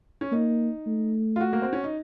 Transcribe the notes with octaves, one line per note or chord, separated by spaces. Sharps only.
C#4
A#3 D#4
A3
F4
F#4
A#3
C4
C#4
D#4